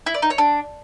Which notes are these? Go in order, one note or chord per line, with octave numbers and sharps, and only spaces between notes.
E4
D5
D#4
C#5
D4